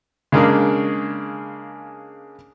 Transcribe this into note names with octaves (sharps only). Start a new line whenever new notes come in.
C#3 G#3 A#3 D4